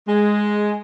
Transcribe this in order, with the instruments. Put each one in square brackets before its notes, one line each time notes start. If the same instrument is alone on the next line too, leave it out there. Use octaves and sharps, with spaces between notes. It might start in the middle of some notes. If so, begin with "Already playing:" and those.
[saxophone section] G#3